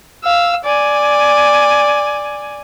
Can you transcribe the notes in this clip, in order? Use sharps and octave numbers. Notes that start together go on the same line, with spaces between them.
F5 E6
D5 G#5